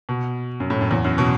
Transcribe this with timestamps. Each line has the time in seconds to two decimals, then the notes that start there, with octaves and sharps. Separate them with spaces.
0.09 B2
0.60 F#2
0.70 A2
0.81 F#2
0.91 E2
1.04 F#2
1.18 B2